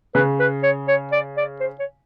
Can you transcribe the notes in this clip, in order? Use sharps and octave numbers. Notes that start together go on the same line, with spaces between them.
C#3 B4
B4
C#5
C#5
D5
D5
C5
C#5